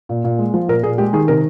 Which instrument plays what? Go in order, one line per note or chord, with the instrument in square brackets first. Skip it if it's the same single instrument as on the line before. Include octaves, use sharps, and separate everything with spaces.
[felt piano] A#2
A#2
G#3
F3
A#2 A#4
A#2 G#4
G#3 G4
D#3 G#4
C3 A#4